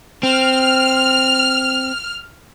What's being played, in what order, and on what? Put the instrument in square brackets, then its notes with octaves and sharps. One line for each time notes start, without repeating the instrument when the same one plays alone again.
[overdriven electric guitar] C4 [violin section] F6